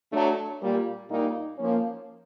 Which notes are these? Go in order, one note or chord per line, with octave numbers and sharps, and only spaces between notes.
F#3 A3 D4
A#2 G3 A#3
A#2 G3 A#3 D#4
F3 A#3 C#4